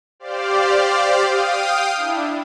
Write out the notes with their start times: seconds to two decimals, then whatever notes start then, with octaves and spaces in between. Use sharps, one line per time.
0.20 G4 C5 D5 F5
1.24 F5 G5 D#6
1.96 D4 E4